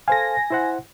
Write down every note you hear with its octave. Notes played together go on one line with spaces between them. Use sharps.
A4 C5 F5 G#5 A#6
E4 C5 F#5